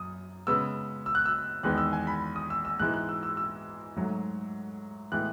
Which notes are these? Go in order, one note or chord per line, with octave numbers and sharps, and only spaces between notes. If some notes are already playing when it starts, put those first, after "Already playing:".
Already playing: F#2 D#6
C#3 G#3 B3 E6
E6
F#6
E6
E2 D#3 G#3 B3 F#6
E6
G#5
B5
D#6
E6
E6
G#2 E3 G#3 B3 F#6
F#6
E6
E6
E6
G#2 F#3 A3
A2 E3 G#3 B3 F#6